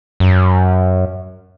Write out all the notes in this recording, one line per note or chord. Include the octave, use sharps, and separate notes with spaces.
F#2